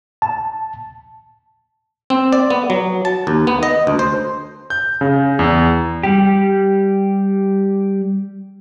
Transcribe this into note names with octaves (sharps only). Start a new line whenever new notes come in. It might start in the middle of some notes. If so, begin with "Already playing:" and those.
A5
C4
D5
B3
F#3
A5
D#2
B3
D#5
D2
C5
G6
C#3
E2
G3 G4